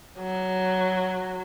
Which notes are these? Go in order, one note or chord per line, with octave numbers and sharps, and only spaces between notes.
F#3